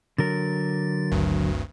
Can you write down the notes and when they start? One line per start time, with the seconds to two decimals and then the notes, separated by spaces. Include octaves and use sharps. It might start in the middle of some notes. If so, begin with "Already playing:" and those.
0.18 D3 F#3 A#4 A6
1.12 G#1 D2 G2